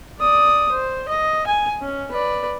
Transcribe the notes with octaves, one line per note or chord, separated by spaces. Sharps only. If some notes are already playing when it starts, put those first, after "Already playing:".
D5 D#6
C5
D#5
G#5
C#4
B4 D5